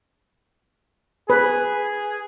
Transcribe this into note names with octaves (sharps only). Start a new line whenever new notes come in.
G#4 B4